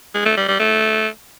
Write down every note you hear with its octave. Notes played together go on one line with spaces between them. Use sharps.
G#3
A3
G3
G3
A3